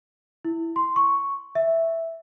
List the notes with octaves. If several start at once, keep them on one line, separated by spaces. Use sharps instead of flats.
E4
C6
C#6
E5